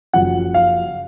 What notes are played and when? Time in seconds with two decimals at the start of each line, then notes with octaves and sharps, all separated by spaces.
0.13 F#1 F#2 F3 F#5
0.54 F5